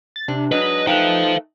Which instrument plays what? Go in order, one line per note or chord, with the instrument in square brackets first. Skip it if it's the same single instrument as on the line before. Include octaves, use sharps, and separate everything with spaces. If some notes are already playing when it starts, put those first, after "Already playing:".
[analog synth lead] A6
[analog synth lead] C3 [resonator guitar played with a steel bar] D4
[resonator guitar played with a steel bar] G#2 F#3 D4 [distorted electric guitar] B4 [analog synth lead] D#5
[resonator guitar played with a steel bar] A3 B4 G5 [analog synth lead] D#4 [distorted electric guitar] C5 F5